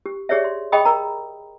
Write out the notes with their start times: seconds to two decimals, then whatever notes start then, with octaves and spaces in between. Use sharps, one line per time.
0.06 G4
0.29 G4 G#4 C#5 D5 E5
0.44 C6
0.72 G#4 D#5 G5 B5 D#6
0.85 A#4 A#5